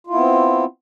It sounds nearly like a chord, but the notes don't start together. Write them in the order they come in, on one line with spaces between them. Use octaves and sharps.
F4 E4 B3 C4